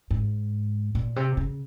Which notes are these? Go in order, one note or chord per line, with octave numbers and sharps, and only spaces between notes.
G#2
A#2
C3
C#3